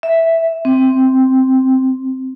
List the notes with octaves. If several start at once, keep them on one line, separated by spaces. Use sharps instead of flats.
E5
C4